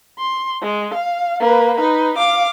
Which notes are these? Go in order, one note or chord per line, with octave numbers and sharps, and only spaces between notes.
C6
G#3
F5
A#3 B4
D#4 B4
F5 D6